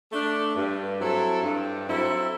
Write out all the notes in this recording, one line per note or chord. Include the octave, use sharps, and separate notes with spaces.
A3 D4
G2
F#3 C4 E4 A4
G2
F#3 C4 E4 A4